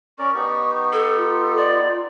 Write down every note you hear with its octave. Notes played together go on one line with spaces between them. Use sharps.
C#4 A#4 D5 C#6
B3 D#4 G4
A4
F4
D5